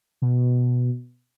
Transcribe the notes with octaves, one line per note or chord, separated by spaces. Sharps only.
B2